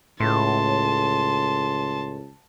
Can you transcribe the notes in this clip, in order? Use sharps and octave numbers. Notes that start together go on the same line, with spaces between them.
C#2 A2 A5 C6